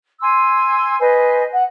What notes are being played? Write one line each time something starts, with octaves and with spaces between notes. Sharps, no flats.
G#5 C6 E6
B4 C5 D#5 G#5
F#5